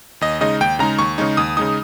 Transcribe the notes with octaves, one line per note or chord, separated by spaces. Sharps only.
D#2 D#5
C#3 G#3 D#4 D#5
D#2 G5
C#3 G#3 D#4 A#5
D#2 C#6
C#3 G#3 D#4
D#2 D#6
C#3 G#3 D#4 D#6